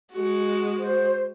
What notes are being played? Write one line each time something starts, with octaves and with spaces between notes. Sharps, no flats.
G#3 F#4
C5